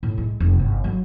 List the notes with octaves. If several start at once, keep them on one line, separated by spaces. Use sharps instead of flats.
A2
G#3
F1
G1
F#3